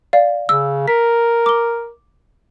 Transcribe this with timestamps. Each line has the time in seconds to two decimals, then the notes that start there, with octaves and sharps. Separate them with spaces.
0.13 D5 F5
0.49 C#3 E6
0.88 A#4 B6
1.46 D6 G7